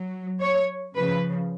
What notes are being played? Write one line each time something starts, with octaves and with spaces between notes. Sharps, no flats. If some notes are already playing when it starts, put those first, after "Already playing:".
Already playing: F#3
C#5
C#3 F3 B4